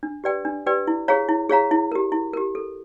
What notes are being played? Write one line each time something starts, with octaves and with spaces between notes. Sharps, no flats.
D4
G4 B4 D5 G5
D4
G4 B4 D5 G5
E4
G#4 C#5 F5 A#5
E4
G#4 C#5 F5 A#5
E4
G4 A#4
E4
G4 A#4
A4